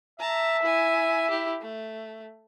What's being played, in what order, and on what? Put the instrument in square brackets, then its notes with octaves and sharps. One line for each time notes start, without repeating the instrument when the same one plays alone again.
[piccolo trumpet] E5 [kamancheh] A5 A#5
[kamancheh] E4 G#5
E4 G4
A3